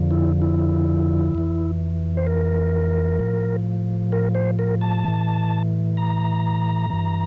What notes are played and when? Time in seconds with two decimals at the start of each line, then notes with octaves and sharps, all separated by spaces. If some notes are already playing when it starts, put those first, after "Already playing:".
Already playing: F2 D3 F3
0.11 E4
0.42 E4
1.35 F2 E3
2.17 C5
2.27 A#4
3.19 A2 F3
4.12 A#4
4.35 C5
4.59 A#4
4.81 A5
5.05 A2 E3
5.97 A#5
6.90 G2 E3